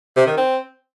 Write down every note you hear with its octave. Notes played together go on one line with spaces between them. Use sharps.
C3
D#3
C4